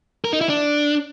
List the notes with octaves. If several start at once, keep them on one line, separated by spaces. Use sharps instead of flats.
A#4
D#4
E4
D4